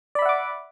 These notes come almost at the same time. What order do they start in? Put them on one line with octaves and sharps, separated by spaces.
D5 B5 E5 F#5 D6